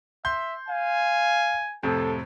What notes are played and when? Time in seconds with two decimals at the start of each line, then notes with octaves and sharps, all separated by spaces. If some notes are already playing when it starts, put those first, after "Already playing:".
0.25 E5 C6 G6
0.69 F5 G#5
1.83 F2 A2 C3 A4